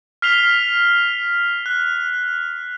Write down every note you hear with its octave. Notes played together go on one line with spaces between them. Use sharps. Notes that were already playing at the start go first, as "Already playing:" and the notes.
F6 B6 C7 F7 G7
F#6